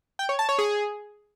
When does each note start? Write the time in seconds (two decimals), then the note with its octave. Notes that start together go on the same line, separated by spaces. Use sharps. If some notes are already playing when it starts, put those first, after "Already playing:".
0.19 G5
0.29 C#5
0.39 A5
0.49 C#5
0.58 G#4